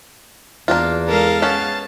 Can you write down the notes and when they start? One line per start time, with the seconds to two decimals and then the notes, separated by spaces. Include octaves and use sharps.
0.68 E2 A#3 D4 F4
1.07 G#3 A4 A#4 F5
1.42 B3 C#4 A5